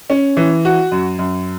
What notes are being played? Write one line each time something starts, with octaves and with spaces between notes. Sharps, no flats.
C#4
E3
F#4
F#2
F#2